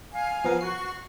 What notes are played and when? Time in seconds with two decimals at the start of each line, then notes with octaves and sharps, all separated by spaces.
0.12 F5 G#5
0.44 F3 B3 A#4
0.61 F#4 C#6 C7